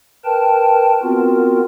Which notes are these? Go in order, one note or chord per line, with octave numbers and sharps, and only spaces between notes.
A#4 B4 G5 A5
B3 C4 F4 F#4 A#4